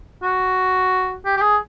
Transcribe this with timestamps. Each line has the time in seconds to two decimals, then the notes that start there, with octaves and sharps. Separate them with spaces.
0.23 F#4
1.26 G4
1.37 G4
1.41 G#4